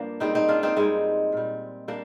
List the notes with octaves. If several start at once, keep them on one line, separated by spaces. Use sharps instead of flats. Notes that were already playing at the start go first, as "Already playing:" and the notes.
Already playing: G2 F3 A#3 D4
G#2 G3 C4 D#4
C4 D#4
D4 F4
C4 D#4
G#2 G3 G#3 C4
A#2 G3
G3 A#3 D4